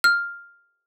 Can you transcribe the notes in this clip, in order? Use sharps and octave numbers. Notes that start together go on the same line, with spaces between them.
F6